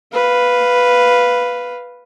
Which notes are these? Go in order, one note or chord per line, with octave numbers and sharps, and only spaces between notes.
B4 F5